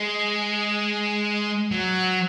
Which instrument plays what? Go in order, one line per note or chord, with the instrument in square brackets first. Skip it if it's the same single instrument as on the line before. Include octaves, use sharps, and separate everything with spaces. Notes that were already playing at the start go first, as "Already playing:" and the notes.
Already playing: [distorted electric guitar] G#3
F#3